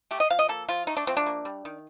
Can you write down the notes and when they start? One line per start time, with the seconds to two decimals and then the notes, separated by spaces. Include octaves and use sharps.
0.11 A3 G4
0.20 D#5
0.30 F3 F5
0.39 D#5
0.48 A#3 A4
0.68 F3 F4
0.87 A3 D#4
0.97 D4
1.07 F3 C4
1.17 D4
1.26 A#3
1.45 G3
1.65 D#3